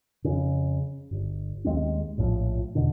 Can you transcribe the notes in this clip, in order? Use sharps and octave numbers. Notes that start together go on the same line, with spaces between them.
F2 C#3
G1
D#2 G#3 C4 C#4
A#1 A2 C#3 F3
E2 B2 D3